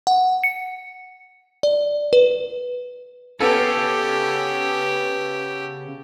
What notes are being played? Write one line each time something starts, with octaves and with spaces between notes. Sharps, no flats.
F#5
C#7
D5
B4
C#3 B3 C#4 G4 A4